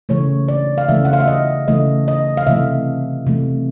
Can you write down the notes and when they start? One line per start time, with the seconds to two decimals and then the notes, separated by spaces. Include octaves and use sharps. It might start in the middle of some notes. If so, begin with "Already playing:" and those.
0.09 C#3 E3 A3 C#5
0.48 D5
0.78 F5
0.89 C#3 E3 A3 E5
1.05 F#5
1.13 F5
1.20 E5
1.28 D#5
1.68 C#3 E3 A3 D#5
2.08 D#5
2.37 F5
2.47 C3 E3 A3 E5
3.27 C3 E3 A3